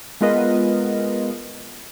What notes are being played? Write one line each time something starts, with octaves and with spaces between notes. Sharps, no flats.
G#3 B3 F4 A#4 B4 D#5